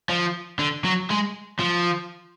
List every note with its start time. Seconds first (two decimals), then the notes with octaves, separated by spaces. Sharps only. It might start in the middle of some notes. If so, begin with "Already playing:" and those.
0.10 F3
0.59 D3
0.85 F#3
1.11 G#3
1.60 F3